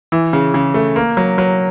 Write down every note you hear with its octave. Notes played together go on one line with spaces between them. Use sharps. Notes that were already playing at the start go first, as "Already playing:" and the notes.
E3
C#3
C#3
A3
A#3
F#3
F#3